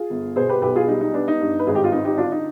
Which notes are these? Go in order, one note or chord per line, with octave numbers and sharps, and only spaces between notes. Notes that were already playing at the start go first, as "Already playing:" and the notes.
Already playing: F4 G#4
G1
B2 G#4 C5
G4 B4
B1 G4 B4
F4 G#4
G3 D#4
D#4
B3 D4
D#4
G2
B4
G#1 G#4
G4
F4
C4 D#4
D#4 G4
D3 D4 F4
D#4